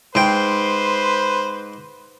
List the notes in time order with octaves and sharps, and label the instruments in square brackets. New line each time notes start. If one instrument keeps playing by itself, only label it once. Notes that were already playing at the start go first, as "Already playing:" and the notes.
[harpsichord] G#2 G5 [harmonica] B4 C5 [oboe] C6